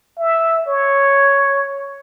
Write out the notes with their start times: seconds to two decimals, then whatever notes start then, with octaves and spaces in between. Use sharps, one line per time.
0.19 E5
0.66 C#5